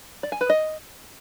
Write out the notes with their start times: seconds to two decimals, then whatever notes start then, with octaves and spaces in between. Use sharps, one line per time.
0.23 D5
0.32 G#5
0.41 B4
0.50 D#5